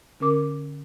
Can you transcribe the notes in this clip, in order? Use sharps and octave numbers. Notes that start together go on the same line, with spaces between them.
D3 C#4 A#4 D6